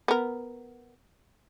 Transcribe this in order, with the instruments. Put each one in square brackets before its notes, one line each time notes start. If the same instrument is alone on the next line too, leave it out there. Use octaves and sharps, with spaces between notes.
[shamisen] B3 A#4